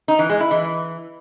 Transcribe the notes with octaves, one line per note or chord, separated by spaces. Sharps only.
D#4
E3
G#3
E4
E3